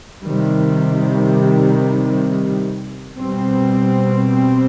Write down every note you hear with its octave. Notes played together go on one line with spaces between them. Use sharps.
C3 D#3 G3
B2 G3 C4